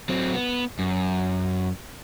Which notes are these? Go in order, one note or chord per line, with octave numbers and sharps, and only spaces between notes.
F#3 C4
B3
F#2